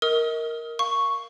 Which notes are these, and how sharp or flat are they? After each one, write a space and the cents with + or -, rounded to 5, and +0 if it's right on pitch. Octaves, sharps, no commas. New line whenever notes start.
A#4 +0 D#5 +35 D#6 +30
F5 +0 C#6 +0